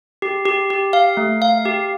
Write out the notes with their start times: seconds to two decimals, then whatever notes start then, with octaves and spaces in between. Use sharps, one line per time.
0.22 G4
0.46 G4
0.70 G4
0.93 F5
1.17 A3
1.42 F5
1.65 G4